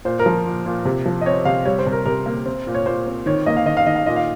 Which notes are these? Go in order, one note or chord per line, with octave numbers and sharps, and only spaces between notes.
A#2 C5
A#4
F3
A#2
A#2
C3
F3
D#5
C4 C#5
C3 F5
G3 C#5
C5
C3
A#4
C3 A#4
A#3
C4
A#2
C#5
A#2 C5
C4
D#3 C#5
A#3 D#5
F5
D#3 D#5
F5
D#3 D#5
F5
A#2 D#5
F5